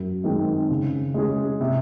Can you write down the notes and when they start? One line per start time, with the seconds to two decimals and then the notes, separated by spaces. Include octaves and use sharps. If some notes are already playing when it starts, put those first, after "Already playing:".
Already playing: F#2
0.24 D#3 G#3 C4
0.70 C#3
1.14 G#3 C#4 G#4
1.60 C3